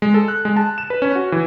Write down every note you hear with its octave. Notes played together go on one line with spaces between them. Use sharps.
G#3
A4
F#6
G#3
A5
E7
B4
C#4
F#4
E3